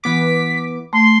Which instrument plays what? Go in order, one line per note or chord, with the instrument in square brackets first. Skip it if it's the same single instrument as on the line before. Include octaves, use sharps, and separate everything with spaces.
[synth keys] E3 B3 D6 [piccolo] B6
[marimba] A3 [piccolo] C6